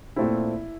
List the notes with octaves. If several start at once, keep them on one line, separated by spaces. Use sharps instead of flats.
A#2 A3 C4 E4